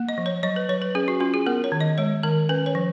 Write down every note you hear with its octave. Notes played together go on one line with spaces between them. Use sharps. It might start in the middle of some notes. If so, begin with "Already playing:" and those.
Already playing: A#3
D#5
F3
C#5
F#3 D#5
B4
F#3 C#5
B4
C#4 G#4
F#4
C#4 F4
G#4
B3 A#4
C#5
D#3
D#5
G#3 C#5
D#3 A#4
C#4 B4
C#5
F3